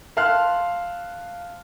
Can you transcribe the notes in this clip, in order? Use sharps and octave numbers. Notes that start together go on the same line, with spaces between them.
E5 F5 A5 C6 F6 F#6